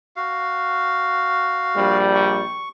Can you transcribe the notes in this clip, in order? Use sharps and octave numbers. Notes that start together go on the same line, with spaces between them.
F#4 F5
A#1 G3
C#6